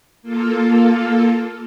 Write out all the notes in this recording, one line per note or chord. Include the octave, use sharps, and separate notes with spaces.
A#3 F4 A4